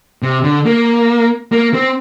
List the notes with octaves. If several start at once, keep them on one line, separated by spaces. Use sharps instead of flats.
C3
D3
A#3
A#3
C4